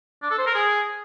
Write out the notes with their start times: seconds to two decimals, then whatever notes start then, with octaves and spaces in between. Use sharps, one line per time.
0.22 D4
0.30 A4
0.39 C5
0.47 A#4
0.55 G#4